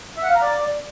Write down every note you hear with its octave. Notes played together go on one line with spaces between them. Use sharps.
E5
F#5
F5
A#5
D5